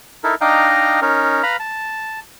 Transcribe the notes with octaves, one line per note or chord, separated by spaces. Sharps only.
D#4 E4 A4 A#4
D4 D#4 D#5 F5 G5 A#5
C#4 D#4 A#4
B4 F5 A#5 B5 F6
A5